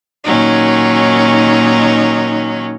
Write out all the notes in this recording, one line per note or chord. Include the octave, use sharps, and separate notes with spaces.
A#2 D#3 F#3 C#4 D#4